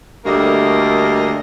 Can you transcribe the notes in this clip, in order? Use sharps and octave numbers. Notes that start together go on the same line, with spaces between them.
D2 G3 A3 A#3 A#4 D#5